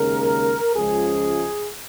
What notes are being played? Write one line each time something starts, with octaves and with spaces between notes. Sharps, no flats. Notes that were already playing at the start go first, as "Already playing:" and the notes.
Already playing: D#2 C#3 G#3 A#4
C#2 C#3 F3 G#3 G#4